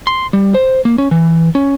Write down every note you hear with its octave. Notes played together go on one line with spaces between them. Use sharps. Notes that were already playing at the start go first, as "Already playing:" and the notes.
C6
G3
C5
A#3
C#4
E3
C#4